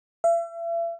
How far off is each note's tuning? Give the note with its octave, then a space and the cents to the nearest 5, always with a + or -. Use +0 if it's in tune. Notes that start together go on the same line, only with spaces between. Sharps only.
E5 +40